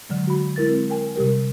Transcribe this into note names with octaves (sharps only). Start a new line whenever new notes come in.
D3 F#3 G#3
F#4 B5
G#3 E4 A#4 A6
C4
A#4 G5 G#5
C3 G3 G4 A#4